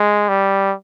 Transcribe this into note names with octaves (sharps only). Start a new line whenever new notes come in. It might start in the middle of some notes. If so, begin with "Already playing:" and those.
Already playing: G#3
G3